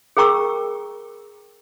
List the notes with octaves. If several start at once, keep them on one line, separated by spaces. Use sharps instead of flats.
G#4 A#4 G5 A#5 C#6 E6